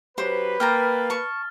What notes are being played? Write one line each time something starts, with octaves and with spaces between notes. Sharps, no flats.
F#3 C#4 G4 B4 C5
A#3 G5 A5 A#5 F6 A6
A5 C#6